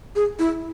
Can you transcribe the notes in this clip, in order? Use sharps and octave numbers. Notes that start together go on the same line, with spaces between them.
G#4
E4